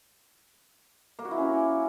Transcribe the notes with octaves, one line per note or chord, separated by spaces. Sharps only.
A#3
F#4
E4
C#4